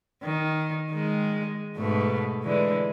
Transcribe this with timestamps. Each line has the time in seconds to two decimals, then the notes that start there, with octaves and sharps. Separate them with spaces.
0.23 D#3
0.91 D#3 G#3
1.76 G#2 B2 A3
2.43 D3 E3 G#3